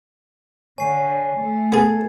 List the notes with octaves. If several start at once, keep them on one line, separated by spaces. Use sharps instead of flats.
D3 C#5 G#5 C7
A3
B3 G#4 A4 G#6 A6